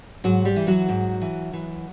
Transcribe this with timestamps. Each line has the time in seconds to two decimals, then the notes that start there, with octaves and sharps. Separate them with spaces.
0.24 G#2 F#3 F#4
0.45 G3 G4
0.56 E3
0.67 F#3 F#4
0.89 G#2
1.21 E3
1.53 E3